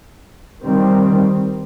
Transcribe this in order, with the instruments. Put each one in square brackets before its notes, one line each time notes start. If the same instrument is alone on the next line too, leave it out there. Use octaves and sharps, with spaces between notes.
[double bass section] D#3 G3 C4